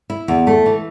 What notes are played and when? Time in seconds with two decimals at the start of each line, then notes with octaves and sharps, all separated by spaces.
0.10 E4
0.28 E2
0.47 A3
0.66 E3